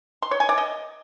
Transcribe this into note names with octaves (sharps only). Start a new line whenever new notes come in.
C6
C#5
G#5
D5
D#5